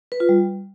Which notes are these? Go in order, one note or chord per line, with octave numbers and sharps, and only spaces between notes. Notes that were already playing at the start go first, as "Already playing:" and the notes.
B4
F4
G3